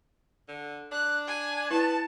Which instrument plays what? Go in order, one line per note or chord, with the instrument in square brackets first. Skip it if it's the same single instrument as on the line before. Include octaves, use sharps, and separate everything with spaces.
[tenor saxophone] D3
[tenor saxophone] D4 [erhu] F#6
[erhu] G#5
[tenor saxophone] B3 [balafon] E4 [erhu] A5